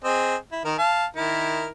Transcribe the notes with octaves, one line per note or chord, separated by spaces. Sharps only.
C4 G#4 D#5
E4
D#3 A#4
F5 A5
D#3 E4 A#4